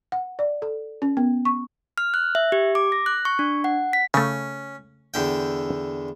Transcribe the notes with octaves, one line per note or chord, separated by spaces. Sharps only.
F#5
D5
A4
C#4
B3
C#6
F6
F#6
E5
G4
D6
A#6
F#6
C#6
D4
F#5
B6
C#3 A3 C#4
E2 D3 G5